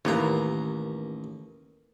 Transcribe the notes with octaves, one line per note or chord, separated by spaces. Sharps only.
A1 D#2 A#3 B3 C#4 A#5